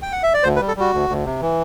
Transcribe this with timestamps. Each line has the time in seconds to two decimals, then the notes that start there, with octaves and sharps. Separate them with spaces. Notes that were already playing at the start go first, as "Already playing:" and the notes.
0.02 G5
0.12 F#5
0.23 E5
0.34 D5
0.43 D2 C5
0.56 B4
0.61 G3
0.68 A4
0.76 G3 F#4
0.93 D2
1.10 D2
1.26 C3
1.41 E3